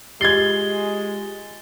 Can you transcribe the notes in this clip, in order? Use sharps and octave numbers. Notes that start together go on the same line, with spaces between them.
G#3 F4 G4 G#6 A6 C7 G7